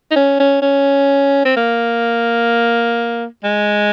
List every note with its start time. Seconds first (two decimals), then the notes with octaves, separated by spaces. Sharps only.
0.11 D#4
0.15 C#4
0.40 C#4
0.62 C#4
1.45 C4
1.56 A#3
3.44 G#3